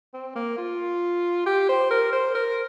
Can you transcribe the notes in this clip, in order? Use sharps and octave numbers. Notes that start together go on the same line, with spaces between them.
C4
A#3
F4
G4
C5
A#4
C5
A#4